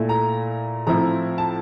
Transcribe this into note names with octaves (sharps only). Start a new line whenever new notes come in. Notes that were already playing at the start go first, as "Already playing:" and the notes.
Already playing: A#2 A3 E4
A#5
A2 F3 C4 E4 A#5
A5